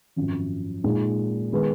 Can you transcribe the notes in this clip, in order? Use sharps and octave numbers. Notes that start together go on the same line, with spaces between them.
G#1 F#2 F3
A#2 G#3 D#4
D#3 G#3 B3